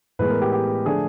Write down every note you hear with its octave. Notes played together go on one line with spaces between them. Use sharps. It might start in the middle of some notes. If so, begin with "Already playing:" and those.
A2 E3 G#3 B3 B4
A#4
G4
G4
D3 F3 A3 D4 G#4